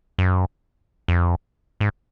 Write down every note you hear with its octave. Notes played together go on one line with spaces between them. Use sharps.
F#2
F2
G#2